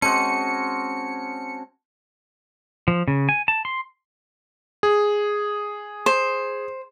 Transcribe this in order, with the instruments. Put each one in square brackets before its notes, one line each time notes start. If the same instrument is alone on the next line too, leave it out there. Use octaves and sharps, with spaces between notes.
[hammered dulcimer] G#3 F#4 [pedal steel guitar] C4 C#4 [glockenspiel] A5 [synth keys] C#7
[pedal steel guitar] F3
C#3
G#5
A5
C6
[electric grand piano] G#4
[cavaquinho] C5